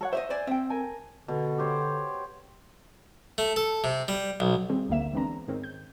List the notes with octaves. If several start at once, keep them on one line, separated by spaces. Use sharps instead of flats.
A4 C#5 F#5
C5 C#5 D#5 E5
C5 D5 G#5
C4 E5 G5
A4 A#4 G#5
B2 D3
G4 C5 C#5
A3
A4
C3
G3
B1
D#3 G3 C4 G4 G#4
G#1 D2 D3 A#3 E5 E7
E3 G#3 B3 C4 D4 A#5
G#2 D#3 C4 C#4
G6